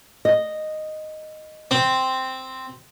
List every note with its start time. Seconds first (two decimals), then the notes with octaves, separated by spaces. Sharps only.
0.25 D#5
1.71 C4